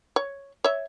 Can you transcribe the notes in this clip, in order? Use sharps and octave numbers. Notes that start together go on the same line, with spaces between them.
C#5
C#5 E5